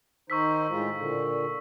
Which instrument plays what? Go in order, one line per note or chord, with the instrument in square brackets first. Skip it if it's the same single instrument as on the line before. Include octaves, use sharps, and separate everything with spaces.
[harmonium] D#3 D#4 C5 [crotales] C#6 E6 B6
[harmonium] A2 G#3 F4
A#2 D3